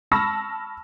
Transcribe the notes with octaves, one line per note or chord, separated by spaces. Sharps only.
A5 B5 C#6 E6 F6 A#6